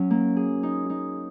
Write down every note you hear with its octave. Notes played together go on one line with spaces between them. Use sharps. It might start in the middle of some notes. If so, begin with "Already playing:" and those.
Already playing: F#3 C#4
A#3
G#4
D#4
D#4